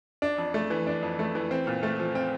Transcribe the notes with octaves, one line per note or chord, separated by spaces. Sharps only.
D4
F2
A3
E3
D4
F2
A3
E3
C4
A#2
A3
F3
C4